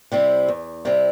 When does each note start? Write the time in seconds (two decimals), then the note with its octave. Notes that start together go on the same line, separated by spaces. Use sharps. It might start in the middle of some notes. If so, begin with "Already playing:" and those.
0.12 C3 G3 C4 E4
0.48 E2
0.85 C3 G3 C4 E4